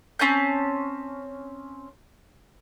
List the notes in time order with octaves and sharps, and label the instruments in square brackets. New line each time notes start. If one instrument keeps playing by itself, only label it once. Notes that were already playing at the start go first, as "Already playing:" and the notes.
[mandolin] C4 C#4 A5 G6